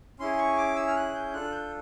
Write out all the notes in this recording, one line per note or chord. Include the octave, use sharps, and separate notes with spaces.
C#4 E4 G#4 C6
C#6
D6
E6
F6
F#6
G6
D4 F4 A4 F#6
G6